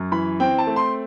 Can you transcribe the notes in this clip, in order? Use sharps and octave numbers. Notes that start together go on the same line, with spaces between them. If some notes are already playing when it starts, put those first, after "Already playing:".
Already playing: F#2
E3 B5
C4 G5
A5
A3
C6